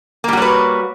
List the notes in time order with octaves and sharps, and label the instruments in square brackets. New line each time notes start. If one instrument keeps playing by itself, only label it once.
[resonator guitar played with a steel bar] A#3
G3
F#4
C#5
B4